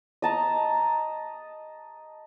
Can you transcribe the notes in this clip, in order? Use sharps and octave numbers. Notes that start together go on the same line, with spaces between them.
D#5 A5 A#5